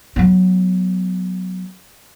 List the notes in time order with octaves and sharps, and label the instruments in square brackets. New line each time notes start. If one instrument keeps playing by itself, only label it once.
[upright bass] F#3 B3